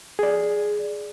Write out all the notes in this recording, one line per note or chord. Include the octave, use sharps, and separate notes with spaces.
G#4 D5